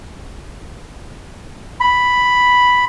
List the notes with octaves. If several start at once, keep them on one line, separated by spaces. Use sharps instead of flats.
B5